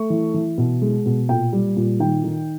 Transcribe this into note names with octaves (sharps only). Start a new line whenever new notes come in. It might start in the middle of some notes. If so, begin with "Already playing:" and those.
Already playing: A3 C#6
E3
E3
B2
G#3
B2
A#2 G5
G3
A#2
D#3 G5
D#3